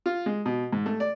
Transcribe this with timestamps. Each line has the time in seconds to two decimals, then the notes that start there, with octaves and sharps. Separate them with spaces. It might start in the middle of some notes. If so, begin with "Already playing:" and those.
0.06 F4
0.26 G#3
0.46 B2
0.73 G#2
0.86 A3
1.00 D5